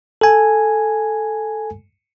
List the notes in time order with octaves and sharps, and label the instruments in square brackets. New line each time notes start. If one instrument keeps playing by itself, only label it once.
[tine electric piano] A4 G#5